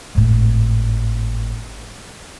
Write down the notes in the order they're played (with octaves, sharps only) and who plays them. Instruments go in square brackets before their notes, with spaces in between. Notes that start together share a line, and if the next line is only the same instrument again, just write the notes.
[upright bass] G#1 A2